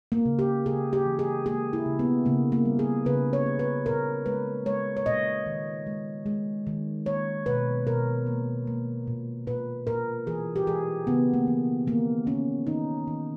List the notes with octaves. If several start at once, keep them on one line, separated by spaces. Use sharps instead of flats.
A#3
C#3
G4
C#3 G#4
G4
E3
G#4
A#3 G#4
E4
C#3
B3
C#3 A#3
A#3
G3
G#4
C#3 B4
C#5
A#3
B4
A#2 A#4
G#3 B4
G#3 C#5
C#5
A#2 D#5
D#3
G#3
G#3
D#3
A#3 C#5
B2 B4
B2 A#4
A#3
A#3
A#2
A#2 B4
A#2 A#4
E3 G#4
G4
E3 G#4
C#3 B3
A#3
E3
D#3 A#3
A#3 C#4
D#3 D#4
D#3